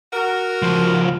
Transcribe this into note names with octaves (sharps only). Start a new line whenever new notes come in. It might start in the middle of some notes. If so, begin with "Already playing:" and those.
F#4 A#4
C#2 F3